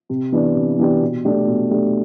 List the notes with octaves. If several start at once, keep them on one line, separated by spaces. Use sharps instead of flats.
C3
E3 B3 D4 G4
C3
E3 B3 D4 G4
B2
A3 D4 G4
B2
A3 D4 G4